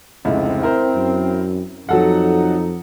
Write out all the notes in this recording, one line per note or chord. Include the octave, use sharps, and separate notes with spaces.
F1 C#2 C4 E4
E4 A#4 C5
F#2
F2 F#3 D#4 A4 F#5